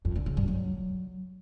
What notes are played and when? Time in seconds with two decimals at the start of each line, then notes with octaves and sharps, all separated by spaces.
0.05 F2
0.15 D3
0.26 C#3
0.37 G2
0.48 F#3